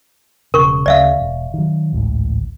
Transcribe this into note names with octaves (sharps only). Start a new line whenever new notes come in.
E1 C#3 A#4 C#6
D2 C#3 D5 E5 F5
E1
D#3 F#3
A1 D2 G#2